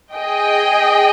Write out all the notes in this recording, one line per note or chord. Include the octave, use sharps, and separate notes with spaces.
G#4 D#5 G5